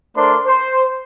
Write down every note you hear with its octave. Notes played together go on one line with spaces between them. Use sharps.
A3 D4 A#4 C5 D5 C6
C5